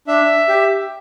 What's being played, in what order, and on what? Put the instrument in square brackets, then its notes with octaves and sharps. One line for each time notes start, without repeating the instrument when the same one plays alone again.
[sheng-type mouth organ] D4 E5
G4